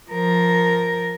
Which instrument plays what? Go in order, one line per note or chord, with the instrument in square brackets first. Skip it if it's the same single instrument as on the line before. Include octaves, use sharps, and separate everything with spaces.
[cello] F3 A#4